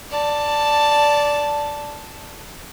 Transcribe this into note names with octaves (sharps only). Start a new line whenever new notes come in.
D5 A5